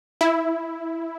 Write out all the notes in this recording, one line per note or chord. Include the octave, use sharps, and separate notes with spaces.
E4